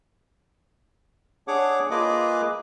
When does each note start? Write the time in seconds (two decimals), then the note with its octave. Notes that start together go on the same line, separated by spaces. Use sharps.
1.48 D4 G#4 C#5 F#5 D6
1.91 A#3 F4 G#4 B4 D#5 D6